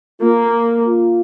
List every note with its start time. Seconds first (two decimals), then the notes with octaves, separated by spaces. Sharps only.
0.21 A#3 F4
0.87 F4